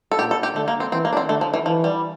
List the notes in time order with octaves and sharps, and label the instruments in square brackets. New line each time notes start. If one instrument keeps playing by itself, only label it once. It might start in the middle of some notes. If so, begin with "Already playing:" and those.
[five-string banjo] A4
[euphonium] A#2 [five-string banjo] G4
[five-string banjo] A4
G4
[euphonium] D3 [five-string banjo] A3
[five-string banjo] A#3
C4
[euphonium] E3 [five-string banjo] C4
[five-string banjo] A#3
D4
C4
[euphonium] D3 [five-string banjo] A3
[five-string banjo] F3
E3
[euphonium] E3 [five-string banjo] F3
[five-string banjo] G3